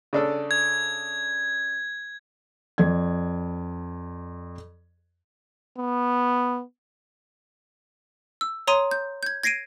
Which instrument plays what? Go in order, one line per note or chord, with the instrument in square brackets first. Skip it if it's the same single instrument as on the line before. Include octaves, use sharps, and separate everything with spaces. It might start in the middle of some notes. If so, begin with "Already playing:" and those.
[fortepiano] C#3 D4 A4
[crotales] G#6
[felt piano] F2 D5 G#6
[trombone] B3
[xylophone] E6
C#5 A#5 C6 D#6 D#7
G6
G6 G#6
G#6 A#6 C7 D7 D#7